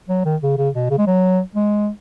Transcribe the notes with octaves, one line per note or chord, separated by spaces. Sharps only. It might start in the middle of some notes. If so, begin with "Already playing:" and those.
F#3
D#3
C#3
C#3
B2
C#3
G#3
F#3
G#3